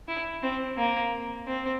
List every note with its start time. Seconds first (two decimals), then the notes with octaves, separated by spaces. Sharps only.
0.08 E4
0.43 C4
0.77 A#3
1.47 C4